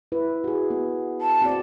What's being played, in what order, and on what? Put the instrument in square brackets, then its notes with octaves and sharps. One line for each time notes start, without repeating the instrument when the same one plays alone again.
[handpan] E4 B4
F#4 G#4
B3
[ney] A5
[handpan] C4 F#4 D5